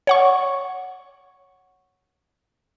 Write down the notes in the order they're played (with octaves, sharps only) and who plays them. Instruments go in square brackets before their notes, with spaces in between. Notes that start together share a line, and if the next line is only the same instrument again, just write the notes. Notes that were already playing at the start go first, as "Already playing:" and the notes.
[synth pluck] C#5 F#5 C#6